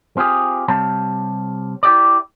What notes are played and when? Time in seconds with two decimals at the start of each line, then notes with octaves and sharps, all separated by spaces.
0.17 C4 F4 G4 G#4
0.68 C3 G3 C4 C#5 F5 A5
1.83 E4 G4 D5